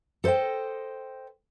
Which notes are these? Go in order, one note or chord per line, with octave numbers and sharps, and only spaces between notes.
A4 C5 D5 D#5 G5